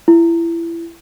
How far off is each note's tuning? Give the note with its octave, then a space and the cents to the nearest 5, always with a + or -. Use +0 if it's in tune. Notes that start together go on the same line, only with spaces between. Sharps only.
E4 +25